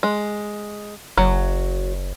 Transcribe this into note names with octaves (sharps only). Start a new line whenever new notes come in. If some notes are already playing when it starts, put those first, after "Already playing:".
G#3
F#1 F#3